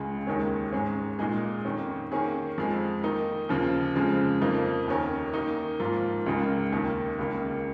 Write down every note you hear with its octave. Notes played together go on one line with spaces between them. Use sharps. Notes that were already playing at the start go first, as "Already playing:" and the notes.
Already playing: C#2 C#3 G#3
D#2 D#3 G#3 C#4 G#4
G#2 G#3 C#4
A#2 G#3 D#4 G#4
F2 D#3 C#4
D#3 A#3 C#4 G#4
F2 F3 G#3
D#3 A#3 D#4
D#2 C#3 F3
F2 C#3 F3 G#3
F2 F3 A#3 D#4
D#2 D#3 C#4 A#4
D#3 A#3 D#4
G#2 F3 A#3 F4 A#4
C#2 C#3 G#3 D#4 A#4
D#2 D#3 A#3
C#2 C#3 A#3